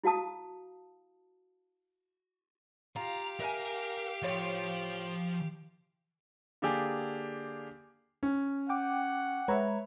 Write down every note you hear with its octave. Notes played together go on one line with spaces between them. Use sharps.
E4 F#4 F5 A5 D#6
F4 G4 F5 A#5
A#4 E5 F#5 G#5
A2 F3 F4 C#5
D3 A#3 D4 G4 G#4
C#4
F#5 G5 D6
G#3 B4 C#5 E5 A#5